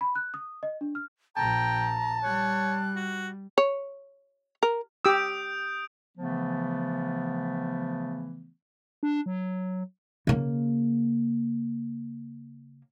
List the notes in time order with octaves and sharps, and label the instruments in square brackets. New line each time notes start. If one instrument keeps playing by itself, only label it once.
[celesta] B5
F#6
D#6
D#5
D4
F6
[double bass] A#1 [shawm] G5 [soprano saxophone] A5 [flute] A#5
[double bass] G3 [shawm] C#5 [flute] F#6
[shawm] F#4
[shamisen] C#5
A#4
[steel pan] G4 E6 [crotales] D#6 G6 D7
[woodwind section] C#3 E3 F3 A3 B3
[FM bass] D4
F#3
[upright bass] C#3 A#3